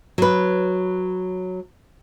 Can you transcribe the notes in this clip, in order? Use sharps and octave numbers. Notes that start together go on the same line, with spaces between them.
F#3 B4